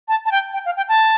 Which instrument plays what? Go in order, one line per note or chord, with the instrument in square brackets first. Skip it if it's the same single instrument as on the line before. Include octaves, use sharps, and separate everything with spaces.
[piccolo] A5
A5
G5
G5
F5
G5
A5